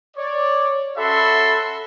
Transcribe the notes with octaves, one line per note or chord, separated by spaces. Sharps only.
C#5 D5
C#4 F#4 A4 E5 B5 C6